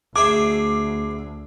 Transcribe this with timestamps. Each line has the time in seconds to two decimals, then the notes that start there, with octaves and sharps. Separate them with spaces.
0.16 D2 G#4 C5 E5 D6